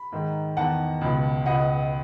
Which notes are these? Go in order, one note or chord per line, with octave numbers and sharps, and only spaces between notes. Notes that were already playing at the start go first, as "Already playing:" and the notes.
Already playing: B5
G#2 D#3
E2 D#3 F#5 A5
C#2 B2
C#2 B2 D#5 F#5